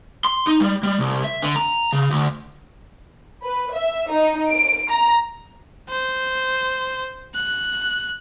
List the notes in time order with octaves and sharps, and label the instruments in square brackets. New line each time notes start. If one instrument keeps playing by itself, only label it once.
[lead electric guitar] C6
D#4
G3
G3
C2
E5
D3
A#5
C#3
D2
[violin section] B4
E5
D#4
D7
A#5
[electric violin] C5
F#6